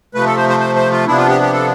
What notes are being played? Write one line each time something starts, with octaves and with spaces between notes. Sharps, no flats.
C3 F3 A3 B4
A4
C5
C5
C5
C5
F4
C3 F3 B3 D4 E4
F4
G4
G4
A4